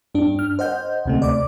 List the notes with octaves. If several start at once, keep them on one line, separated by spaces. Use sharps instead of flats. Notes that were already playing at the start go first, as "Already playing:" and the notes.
G2 D4
F6
C5 D#5 F#5 G6
D2 C3 A3
D5 D6